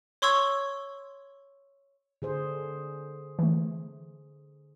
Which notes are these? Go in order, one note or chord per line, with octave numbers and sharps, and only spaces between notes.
C#5 C6 C#6 E6 G#6
D3 G#4 C5
E3 A3